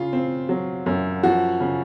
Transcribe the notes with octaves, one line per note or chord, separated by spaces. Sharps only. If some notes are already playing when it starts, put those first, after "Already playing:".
Already playing: C#3 F4
C4
F#3
F#2
F3 F#4
C#3